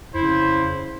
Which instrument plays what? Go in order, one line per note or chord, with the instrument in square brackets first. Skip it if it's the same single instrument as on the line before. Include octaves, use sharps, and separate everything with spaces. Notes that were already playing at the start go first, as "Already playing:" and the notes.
[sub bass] F2 [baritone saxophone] C#3 [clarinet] E4 [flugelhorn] C5